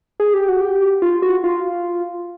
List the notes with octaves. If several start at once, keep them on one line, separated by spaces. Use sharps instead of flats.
G#4
G4
F#4
G4
F4
F#4
F4